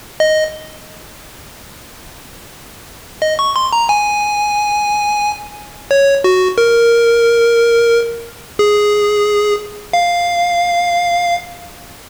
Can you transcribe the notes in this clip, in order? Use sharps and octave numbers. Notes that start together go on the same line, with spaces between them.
D#5
D#5
C#6
C6
A#5
G#5
C#5
F#4
A#4
G#4
F5